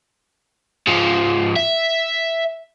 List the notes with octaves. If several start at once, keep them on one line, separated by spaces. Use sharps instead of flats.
G#2 F3
E5